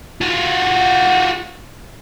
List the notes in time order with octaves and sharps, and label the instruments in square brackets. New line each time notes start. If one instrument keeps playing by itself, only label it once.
[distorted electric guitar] F4 F#4